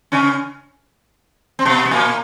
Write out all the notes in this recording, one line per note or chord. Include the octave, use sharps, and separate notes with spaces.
C#3 C#4
C4
B2 B3
B3
A#2 A#3